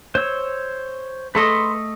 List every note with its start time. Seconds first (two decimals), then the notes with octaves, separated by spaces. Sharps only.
0.15 C5 C#5 E6
1.35 A3 A4 B4 D#5 C6